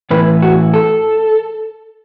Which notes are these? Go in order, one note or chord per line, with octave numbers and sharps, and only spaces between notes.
A2 E3 B4
F#4
A4